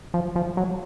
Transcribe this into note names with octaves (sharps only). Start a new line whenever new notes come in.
F3
F3
F#3